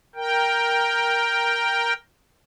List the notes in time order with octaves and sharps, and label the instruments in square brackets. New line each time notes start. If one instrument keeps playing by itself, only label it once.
[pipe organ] A#4 G5